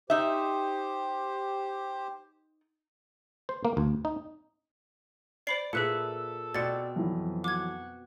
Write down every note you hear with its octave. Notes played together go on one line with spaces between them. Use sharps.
D#4 G4 C5 E5
C5
A#3
D2
D#4
C5 D5 B5 C7
A#2 G#4 A4 B4 E5 F#6 C#7
B2 C4 D5 A6 C#7
F2 E3 F#3
F#4 D6 G#6